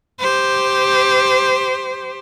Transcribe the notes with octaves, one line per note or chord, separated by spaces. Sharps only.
G4 C5